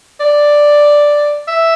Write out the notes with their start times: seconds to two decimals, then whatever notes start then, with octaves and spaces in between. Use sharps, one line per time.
0.20 D5
1.48 E5